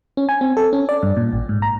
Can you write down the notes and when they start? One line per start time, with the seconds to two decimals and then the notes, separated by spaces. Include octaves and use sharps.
0.17 C#4
0.29 G#5
0.41 C4
0.57 A4
0.73 C#4
0.89 D5
1.03 G2
1.17 A#2
1.33 A1
1.49 G#2
1.62 A#5